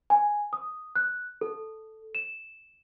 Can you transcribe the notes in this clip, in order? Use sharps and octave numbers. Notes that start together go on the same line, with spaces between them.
G#5
D#6
F#6
A4
E7